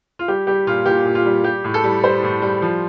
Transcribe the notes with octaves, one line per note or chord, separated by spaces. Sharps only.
F4
G3 G4
G3 G4
A#2 F4
A#2 G4
A#2
F4
G3
G3 G4
A2
A4
G3
G3 C5
A2
G3
F3